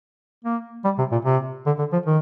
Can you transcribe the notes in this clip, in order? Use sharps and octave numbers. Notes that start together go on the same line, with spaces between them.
A#3
G3
C3
A#2
C3
D3
D3
F3
D#3